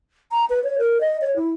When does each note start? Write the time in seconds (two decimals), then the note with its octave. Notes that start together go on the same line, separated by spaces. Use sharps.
0.32 A#5
0.50 B4
0.64 C#5
0.78 A#4
1.01 D#5
1.21 C#5
1.36 E4